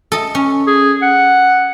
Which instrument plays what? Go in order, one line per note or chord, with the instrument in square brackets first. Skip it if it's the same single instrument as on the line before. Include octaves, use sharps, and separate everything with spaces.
[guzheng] A4 D#5
C#4
[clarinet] G#4
F#5